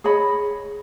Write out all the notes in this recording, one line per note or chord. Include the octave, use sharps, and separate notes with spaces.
G#4 C#5 D#5 B5